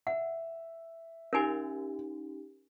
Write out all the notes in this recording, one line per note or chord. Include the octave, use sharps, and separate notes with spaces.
E5 F#5
C#4 D#4 G4 A#4 G#5